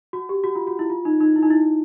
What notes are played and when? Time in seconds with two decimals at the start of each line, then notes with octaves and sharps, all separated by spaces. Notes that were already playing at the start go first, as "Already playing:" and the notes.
0.13 F#4
0.29 G4
0.44 F#4
0.55 F4
0.67 F#4
0.79 E4
0.90 F4
1.05 D#4
1.21 D#4
1.36 E4
1.43 D#4
1.50 E4